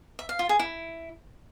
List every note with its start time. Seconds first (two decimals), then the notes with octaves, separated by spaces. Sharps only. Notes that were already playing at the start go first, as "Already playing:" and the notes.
0.19 E5
0.29 F5
0.39 F4
0.49 G#4
0.59 E4